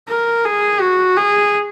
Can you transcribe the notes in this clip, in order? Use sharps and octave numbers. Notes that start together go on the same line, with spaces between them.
A#4
G#4
F#4
G#4